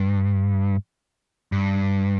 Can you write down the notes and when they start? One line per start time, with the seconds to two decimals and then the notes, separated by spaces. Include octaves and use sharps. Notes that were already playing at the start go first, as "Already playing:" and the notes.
Already playing: G2
1.52 G2